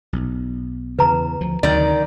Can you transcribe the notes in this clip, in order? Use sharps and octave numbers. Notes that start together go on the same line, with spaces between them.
B1
E2 C#3 B4 A#5
D2 F3
D2 C3 D#3 F#3 D5